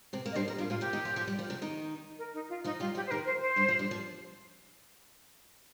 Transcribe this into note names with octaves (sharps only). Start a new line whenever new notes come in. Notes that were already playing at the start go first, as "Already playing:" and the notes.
C3 C4
A#3
D#5
G2 G3 C5
F3 A#4
G2 G3 F4
A#2 A#3 F4
C3 C4 G4
D#3 D#4
F3 F4
F3 F4
G3 G4
F3 F4
C3 C4
D#3 D#4
A#4
D#4
F4
F3 D#4 F4
G3 F4 G4
F3 F4 G4
C5
D#3 D#4 A#4
C5
C5
G2 G3
F3
G2 G3
F3